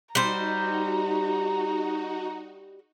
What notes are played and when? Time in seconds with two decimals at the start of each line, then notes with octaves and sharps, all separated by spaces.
0.15 G3 D#4 F#4 C5 A#5